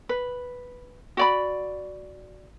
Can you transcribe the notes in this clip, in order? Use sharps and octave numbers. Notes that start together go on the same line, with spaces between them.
B4
F#4 D5 B5